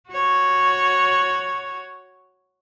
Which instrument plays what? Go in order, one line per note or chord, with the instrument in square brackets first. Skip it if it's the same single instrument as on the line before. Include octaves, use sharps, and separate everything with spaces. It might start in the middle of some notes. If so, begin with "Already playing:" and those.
[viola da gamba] F#4 C#5